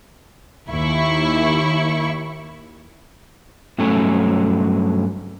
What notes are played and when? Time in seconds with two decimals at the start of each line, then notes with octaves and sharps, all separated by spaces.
0.69 D#2 E4 C#6
3.78 G2 F#3 A3 C#4 A4 C#5